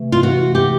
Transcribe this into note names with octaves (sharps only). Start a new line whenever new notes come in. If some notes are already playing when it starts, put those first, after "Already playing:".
Already playing: C3 E3 A3
F4
F#4
G4